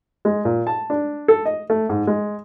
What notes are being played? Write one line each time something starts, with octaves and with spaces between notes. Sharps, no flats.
G#3
A#2
A5
D4
A4
D#5
A3
G#2
G#3